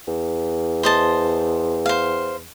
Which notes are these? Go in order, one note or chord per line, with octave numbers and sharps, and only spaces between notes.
E2
C5 D#5 A5
C5 F5